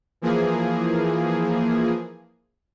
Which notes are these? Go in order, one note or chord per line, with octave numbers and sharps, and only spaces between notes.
E3 F3 A#3 G#4